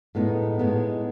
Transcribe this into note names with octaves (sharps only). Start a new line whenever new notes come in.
A2 G#3 B3 D#4
A2 G#3 B3 D#4